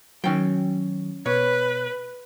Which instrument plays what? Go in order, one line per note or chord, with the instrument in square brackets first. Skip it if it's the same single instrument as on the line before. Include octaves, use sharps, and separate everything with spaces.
[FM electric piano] D#3 F#3 [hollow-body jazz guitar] C#4 G5
[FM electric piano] B2 [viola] B4 [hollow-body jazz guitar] C#5